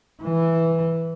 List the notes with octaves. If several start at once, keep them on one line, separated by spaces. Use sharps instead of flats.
E3